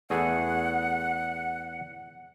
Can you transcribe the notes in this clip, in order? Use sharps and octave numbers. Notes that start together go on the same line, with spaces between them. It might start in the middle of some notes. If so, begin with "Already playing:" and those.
E2 A3 G#4 F#5